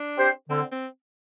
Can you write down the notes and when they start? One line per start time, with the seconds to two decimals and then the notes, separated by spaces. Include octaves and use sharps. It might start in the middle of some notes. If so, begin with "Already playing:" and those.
Already playing: D4
0.17 C4 G4 C5
0.50 D3 C4
0.72 C4